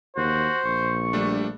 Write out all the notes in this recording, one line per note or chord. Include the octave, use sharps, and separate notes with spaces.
D#2 F#4 C5
A#1 C#6
G3 A3 D4